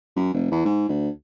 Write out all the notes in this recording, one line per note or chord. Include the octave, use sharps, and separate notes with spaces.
F#2
F1
E2
G#2
D2